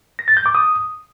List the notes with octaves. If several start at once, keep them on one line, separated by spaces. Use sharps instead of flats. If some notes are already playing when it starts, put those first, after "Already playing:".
A#6
A6
G6
D6
D#6